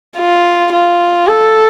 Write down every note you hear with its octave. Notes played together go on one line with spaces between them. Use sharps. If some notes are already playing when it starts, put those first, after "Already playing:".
F4
F4
A4